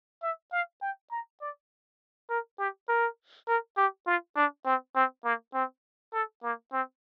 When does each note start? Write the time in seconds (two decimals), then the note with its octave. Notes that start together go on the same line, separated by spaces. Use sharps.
0.23 E5
0.53 F5
0.82 G5
1.11 A#5
1.41 D5
2.30 A#4
2.59 G4
2.89 A#4
3.48 A#4
3.77 G4
4.07 F4
4.37 D4
4.66 C4
4.95 C4
5.24 A#3
5.54 C4
6.14 A4
6.43 A#3
6.73 C4